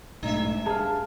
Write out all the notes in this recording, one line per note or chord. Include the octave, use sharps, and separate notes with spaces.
B1 G#2 A3 D4 E5
G2 G#4 F5 A5